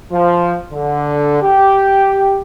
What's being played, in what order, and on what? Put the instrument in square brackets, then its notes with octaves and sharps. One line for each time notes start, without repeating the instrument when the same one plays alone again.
[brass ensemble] F3
D3
G4